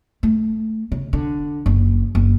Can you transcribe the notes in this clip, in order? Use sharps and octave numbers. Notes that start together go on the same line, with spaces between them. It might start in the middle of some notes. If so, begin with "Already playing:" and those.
A3
C#3
D3
F#1
F#1